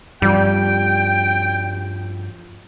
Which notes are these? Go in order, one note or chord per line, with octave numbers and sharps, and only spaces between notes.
G2 F3 G3 G5